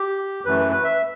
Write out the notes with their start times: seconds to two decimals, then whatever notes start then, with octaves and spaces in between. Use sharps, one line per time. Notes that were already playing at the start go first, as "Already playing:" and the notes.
Already playing: G4
0.45 F#2 E3 A3 B4
0.59 B4
0.72 B4
0.84 E5